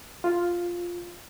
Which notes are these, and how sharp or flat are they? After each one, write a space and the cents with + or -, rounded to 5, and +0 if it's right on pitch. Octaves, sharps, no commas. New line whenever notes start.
F4 +0